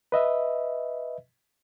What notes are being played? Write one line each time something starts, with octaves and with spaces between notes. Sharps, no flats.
B4 D#5 E5